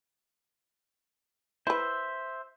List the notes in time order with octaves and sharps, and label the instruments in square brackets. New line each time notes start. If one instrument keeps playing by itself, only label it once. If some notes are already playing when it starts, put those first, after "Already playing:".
[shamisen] E4 B4 [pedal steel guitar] C5 E5